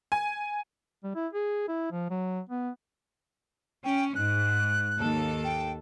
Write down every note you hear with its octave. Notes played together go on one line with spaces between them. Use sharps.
G#5
G3
E4
G#4
E4
F3
F#3
B3
C#4 G5
G#2 F#6
D#2 A4
G5